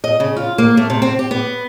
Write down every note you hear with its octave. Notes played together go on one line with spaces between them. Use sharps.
D#5
C#3
F4
A#3
A3
C3
C4
G4
B3